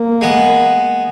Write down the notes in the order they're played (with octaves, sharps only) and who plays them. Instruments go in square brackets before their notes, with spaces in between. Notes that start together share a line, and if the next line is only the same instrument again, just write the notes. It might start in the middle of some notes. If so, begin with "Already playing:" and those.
Already playing: [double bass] A#3
[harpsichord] G#3 B3